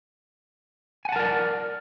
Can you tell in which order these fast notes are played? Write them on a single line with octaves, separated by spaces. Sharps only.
G#5 F#5 A5 A#4 D5